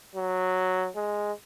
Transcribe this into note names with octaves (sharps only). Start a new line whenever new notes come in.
F#3
G#3